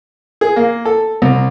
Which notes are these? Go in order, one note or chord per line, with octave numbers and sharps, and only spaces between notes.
G#4
A#3
A4
C2